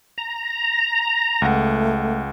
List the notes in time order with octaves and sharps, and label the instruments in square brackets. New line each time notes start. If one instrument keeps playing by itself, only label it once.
[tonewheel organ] A#5
[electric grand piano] C#2 F#5 [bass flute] A3